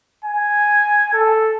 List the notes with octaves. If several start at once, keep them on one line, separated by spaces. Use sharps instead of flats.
G#5
A4